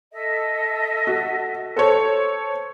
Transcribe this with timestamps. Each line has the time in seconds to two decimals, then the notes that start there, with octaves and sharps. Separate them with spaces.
0.12 A4 D#5 E5
1.07 F#4
1.77 A4 C5 C#5